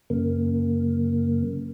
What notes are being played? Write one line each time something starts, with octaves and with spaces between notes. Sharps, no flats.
F#2 C#3 A#3